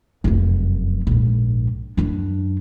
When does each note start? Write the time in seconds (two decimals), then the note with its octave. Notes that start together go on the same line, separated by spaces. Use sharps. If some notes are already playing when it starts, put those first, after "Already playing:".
0.24 F1 F#2
1.07 A#1 G#2
1.97 F#2 D4